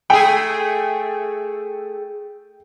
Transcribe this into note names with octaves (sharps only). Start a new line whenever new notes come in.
A3 G#4 G5